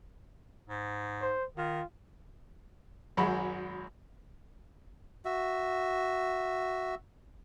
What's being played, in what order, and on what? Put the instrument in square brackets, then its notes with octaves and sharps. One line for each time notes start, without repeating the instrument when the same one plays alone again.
[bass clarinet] G#2
[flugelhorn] C5
[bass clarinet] D#3 [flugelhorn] F4
[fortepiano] G#1 F#2 G#3 F#4 B5
[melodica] F#4 E5